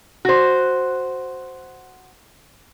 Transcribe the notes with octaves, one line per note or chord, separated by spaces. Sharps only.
F#4 C5